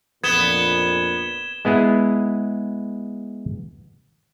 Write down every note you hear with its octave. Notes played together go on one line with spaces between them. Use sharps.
A#1 F2 A#2 B3 G#6 E7 G7
G#3 B3 E4 G#4